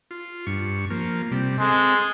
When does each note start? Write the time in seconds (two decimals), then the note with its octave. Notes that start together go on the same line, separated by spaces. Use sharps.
0.11 F4
0.47 G2 C#6
0.90 F3 A#3
1.31 C3 G3
1.60 G#3 C4 A4